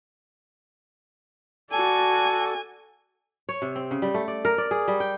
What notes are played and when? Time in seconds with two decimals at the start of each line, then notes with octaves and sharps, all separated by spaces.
1.72 F#4 A4 D5 G#5
3.49 C#5
3.62 C3
3.76 C4
3.91 C#3
4.02 G3
4.14 A3
4.28 D5
4.45 A#4
4.58 D5
4.71 G#4
4.88 G3
5.00 G5